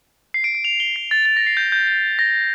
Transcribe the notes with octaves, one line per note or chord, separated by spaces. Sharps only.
C7
D7
D7
F7
G7
C7
A6
A6
A#6
C7
G6
G6
G6
A#6